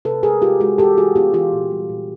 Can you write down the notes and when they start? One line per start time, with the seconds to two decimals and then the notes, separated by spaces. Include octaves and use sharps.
0.05 C3 A4 B4
0.23 G#3 G#4 A#4
0.42 G#3 F4 G4
0.60 G#3 F#4 G#4
0.78 E3 G4 A4
0.98 E3 F#4 G#4
1.16 B3 F4 G4
1.34 E3 F4 G4
1.53 A#2
1.71 G3
1.89 A#2